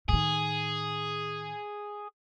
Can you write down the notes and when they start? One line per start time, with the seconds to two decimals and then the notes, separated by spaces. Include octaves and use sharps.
0.09 A2 D#3 G#4